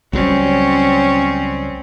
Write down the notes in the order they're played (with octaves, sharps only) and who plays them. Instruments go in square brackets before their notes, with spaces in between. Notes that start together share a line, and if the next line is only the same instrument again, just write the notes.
[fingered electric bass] C#2 F#3 G3 [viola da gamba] C4 C#4